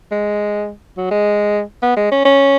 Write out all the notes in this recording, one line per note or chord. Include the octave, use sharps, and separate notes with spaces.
G#3
F#3
G#3
B3
G#3
C#4
C#4